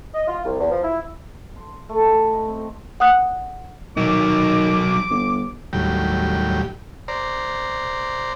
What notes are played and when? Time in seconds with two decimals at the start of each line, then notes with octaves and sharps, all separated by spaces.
0.14 D#5
0.28 F4
0.45 C2
0.59 E2
0.71 F3
0.83 E4
1.56 C6
1.89 A3
2.11 E4
2.33 D#5
2.48 C4
3.00 F#5 D#6 F#6
3.97 D#3 F#3 D#4 D6
5.10 G1
5.73 D#2 A2 F#3 G3 G5
7.08 C5 D5 A#5